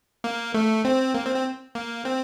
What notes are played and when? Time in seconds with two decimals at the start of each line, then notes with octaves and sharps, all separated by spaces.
0.24 A#3
0.54 A3
0.85 C4
1.15 A#3
1.25 C4
1.36 C4
1.75 A#3
2.05 C4